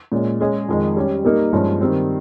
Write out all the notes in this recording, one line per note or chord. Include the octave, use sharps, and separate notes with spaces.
A#2 G#3 C#4
G#3 C#4 G#4 D#5
F2 D#3 G#3
G3 C#4 G4
G3 A#3 D#4 A#4
G2 F3 G#3 C#4
D#3 G3 C4